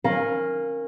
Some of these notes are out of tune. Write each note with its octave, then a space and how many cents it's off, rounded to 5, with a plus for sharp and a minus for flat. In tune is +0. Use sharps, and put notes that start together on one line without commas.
C#4 -25 A#4 +0 F5 +0